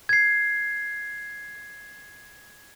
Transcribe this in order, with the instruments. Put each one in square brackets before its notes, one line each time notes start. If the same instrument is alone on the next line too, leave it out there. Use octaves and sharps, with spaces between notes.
[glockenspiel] G#6 C7